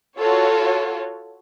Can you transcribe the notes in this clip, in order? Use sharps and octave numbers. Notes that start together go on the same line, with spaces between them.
F4 F#4 A4 C#5